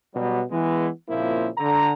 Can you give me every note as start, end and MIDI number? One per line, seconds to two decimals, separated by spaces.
0.14 0.41 47
0.14 0.41 54
0.14 0.41 55
0.51 0.88 52
0.51 0.88 56
0.51 0.88 59
1.09 1.49 46
1.09 1.49 49
1.09 1.49 53
1.09 1.49 58
1.09 1.49 60
1.09 1.49 64
1.58 1.92 50
1.58 1.92 82